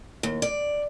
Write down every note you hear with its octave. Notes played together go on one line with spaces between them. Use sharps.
D#2
D5